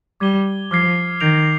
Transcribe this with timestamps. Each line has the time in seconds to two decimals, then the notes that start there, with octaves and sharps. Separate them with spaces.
0.20 G3 D6 G#6 D#7 G7
0.71 F3 D6 F6 G#6 C7
1.21 D#3 G6 A#6 D7 F7